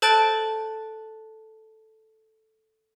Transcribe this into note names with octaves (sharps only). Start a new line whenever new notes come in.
A4 C5 A5 F#6 A6 D7